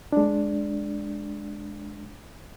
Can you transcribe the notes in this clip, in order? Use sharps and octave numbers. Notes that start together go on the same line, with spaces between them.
G#3 D4